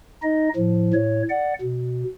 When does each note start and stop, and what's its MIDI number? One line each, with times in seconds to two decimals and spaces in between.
0.23 0.49 63
0.23 0.49 75
0.56 0.93 45
0.56 0.93 53
0.94 1.23 45
0.94 1.23 73
1.30 1.54 74
1.30 1.54 78
1.62 2.04 47